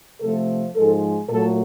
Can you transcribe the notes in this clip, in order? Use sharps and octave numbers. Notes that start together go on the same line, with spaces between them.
C3 F3 A3 A4
G#2 F3 G#3 A4
A#2 F#3 A3 A4